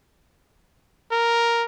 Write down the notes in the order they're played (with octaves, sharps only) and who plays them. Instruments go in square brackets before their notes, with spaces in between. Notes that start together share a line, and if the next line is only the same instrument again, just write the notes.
[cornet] A#4